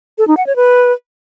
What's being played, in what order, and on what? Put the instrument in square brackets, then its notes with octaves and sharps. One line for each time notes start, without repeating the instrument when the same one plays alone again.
[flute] A4
D#4
F#5
C#5
B4